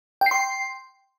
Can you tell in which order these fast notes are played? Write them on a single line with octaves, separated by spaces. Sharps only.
G5 C7 C6